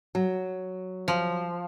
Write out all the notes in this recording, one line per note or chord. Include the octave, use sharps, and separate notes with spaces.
F#3
F3